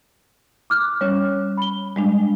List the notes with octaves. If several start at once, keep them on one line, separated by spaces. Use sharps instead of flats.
D6 F6 F#6
G3 C#4 C#5
B5 G7
G3 G#3 D4